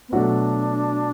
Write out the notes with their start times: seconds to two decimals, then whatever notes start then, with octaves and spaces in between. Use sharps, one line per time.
0.08 B3
0.13 B2 F#3 A3 D4 F#4